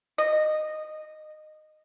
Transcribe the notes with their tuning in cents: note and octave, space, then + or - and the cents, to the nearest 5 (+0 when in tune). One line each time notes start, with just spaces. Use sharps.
D#5 -15